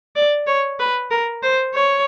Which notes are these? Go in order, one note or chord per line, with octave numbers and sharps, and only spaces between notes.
D5
C#5
B4
A#4
C5
C#5